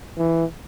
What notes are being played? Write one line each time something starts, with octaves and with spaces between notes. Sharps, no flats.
E3